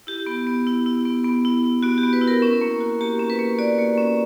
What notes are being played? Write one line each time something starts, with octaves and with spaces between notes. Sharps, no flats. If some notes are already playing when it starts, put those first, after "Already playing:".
E4 G4
B3
B3
E4
E4
B3
B3
E4
E4
B3 F#4
G4
B3
B4
E4
A#4
C#4
A#3
F#4
A#3 G4
C#4
B4
A#3
F#4 D5
A#3
C#4